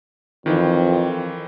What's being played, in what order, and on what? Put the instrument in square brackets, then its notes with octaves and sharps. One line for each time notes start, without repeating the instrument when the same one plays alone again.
[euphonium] F2 [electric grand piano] D#3 E3